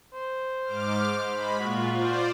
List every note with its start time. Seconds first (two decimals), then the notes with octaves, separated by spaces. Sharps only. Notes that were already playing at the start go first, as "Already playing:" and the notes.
0.14 C5
0.65 G#2 D6 F6
1.29 G#3 B5
1.60 A#2 F4 F#4
1.93 F4 C5 D5